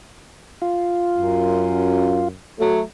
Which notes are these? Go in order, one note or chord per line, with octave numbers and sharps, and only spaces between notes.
F4
F#2
F#3 A3